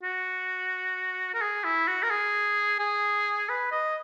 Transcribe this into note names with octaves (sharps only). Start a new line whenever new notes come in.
F#4
A#4
G#4
E4
F#4
A#4
G#4
G#4
B4
D#5